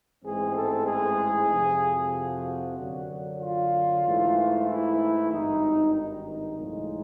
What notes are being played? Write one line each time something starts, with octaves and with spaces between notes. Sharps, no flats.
A1 G#2 E3 G#3 C4 G#4
A4
G#4
F2 C3 F3
F#4
F#2 D3 F#3
F4
G#2 E3 A3
E4
G#1 G2 D#3 D#4
D#4
B1 A2 F3 G#3